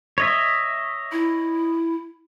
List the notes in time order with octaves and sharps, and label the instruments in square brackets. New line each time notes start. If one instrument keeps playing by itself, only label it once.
[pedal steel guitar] C#5 D#5 E5
[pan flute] E4